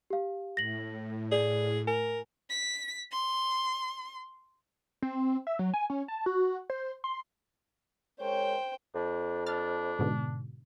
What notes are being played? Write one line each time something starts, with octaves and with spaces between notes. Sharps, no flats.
G4 F5
A2 A#6 F#7
G#4 D5
A#4 G#5
B6
C6
C4
E5
F#3
G#5
C#4
A5
F#4
C5
C6
G#3 A#4 C5 C#5 G5
F2 D4
D4 F6 A6
G#2 B2 D3